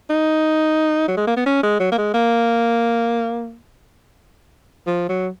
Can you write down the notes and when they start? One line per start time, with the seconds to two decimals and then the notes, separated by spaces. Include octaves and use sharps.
0.10 D#4
1.08 F#3
1.17 G#3
1.27 A#3
1.37 B3
1.46 C#4
1.63 G#3
1.80 F#3
1.92 A#3
1.98 G#3
2.14 A#3
4.87 F3
5.09 F#3